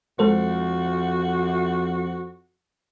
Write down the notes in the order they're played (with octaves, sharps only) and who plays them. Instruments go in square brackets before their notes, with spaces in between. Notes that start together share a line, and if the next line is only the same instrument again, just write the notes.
[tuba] F2 [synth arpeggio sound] G#3 A4 C5 [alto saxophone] F#4